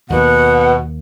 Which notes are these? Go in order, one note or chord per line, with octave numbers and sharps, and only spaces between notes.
D#2 B2 A#3 F#5